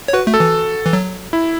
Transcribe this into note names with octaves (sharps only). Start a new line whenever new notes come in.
C#5
F#4 B4
A3
A4
E3
E3
F#3
E4